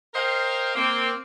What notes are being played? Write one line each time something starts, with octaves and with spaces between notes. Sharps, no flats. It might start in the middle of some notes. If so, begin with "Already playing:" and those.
A#4 C5 D#5 F5 G5
A#3 C4